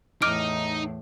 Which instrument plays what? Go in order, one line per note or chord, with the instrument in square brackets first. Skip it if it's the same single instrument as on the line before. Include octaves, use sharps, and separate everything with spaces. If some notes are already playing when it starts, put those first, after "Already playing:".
[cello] E2 A2 [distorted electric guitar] D#4 [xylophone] D6 F6 D7